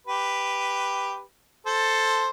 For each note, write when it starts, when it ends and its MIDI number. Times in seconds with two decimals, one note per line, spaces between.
0.07 1.22 67
0.07 1.22 71
1.66 2.30 69
1.66 2.30 72